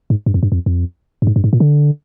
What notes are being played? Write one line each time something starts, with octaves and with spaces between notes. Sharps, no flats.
G#2
G2
F2
G2
F2
F2
G2
G#2
G2
G#2
A#2
D3